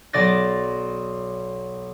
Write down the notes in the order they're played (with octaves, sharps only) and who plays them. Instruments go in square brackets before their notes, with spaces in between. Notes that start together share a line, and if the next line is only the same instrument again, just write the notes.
[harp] B1 D5 D6 A6 A#6